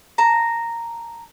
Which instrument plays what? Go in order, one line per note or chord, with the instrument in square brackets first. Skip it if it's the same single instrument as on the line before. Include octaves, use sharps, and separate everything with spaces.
[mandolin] A5 A#5